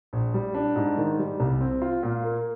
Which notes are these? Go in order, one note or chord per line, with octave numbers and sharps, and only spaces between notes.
A#1
G3
D4
G#2
D#3
G3
C2
C4
F4
A#2
A#3